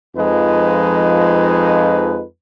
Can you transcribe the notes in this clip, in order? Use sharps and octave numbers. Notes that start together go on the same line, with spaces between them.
F2 F3 G#3 D#4 B4